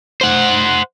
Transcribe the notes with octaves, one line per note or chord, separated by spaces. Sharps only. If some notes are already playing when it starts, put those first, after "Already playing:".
C5 F#5